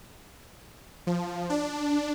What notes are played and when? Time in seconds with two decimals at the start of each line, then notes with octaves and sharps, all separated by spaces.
1.07 F3
1.50 D4